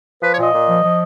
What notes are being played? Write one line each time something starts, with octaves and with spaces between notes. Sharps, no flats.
F3 B4
C#5
A#2
D#5
A#2
F3
F3